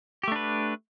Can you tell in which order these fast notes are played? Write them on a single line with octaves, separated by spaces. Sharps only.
G4 A3 D4 B4